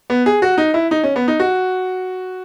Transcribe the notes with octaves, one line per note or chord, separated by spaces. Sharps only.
B3
G#4
F#4
D#4
E4
D#4
C#4
B3
D#4
F#4